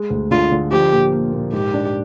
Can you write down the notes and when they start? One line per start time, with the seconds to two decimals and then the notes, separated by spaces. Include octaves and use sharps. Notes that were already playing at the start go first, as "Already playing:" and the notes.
Already playing: G#3
0.10 D2
0.31 D3 F4
0.51 D3
0.72 F3 G4
0.92 A#2
1.12 A#3
1.32 A#2
1.52 G#2 G4
1.74 D4